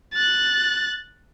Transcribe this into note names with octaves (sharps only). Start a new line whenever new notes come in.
F#6 A6